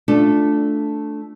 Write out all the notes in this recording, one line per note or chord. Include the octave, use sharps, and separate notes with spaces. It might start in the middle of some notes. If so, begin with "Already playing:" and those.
A3 D4 F4 A4